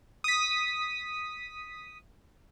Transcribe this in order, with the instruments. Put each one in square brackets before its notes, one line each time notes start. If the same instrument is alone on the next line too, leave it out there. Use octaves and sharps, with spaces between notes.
[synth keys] D#6 B6